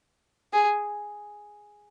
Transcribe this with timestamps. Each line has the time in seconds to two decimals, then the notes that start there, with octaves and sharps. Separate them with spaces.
0.53 G#4